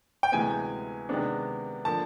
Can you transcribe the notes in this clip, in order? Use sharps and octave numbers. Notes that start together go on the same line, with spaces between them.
G5
D2 C3 E3 G#3 B3 G#5
C3 D#3 G#3 B3 D4
D3 F3 A#3 A5